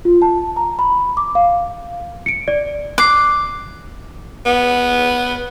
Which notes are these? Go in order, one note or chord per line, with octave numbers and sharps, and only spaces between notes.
F4
A5
A#5
B5
D6
F5
C#7 D7
D5
D6 F#6 C7
B3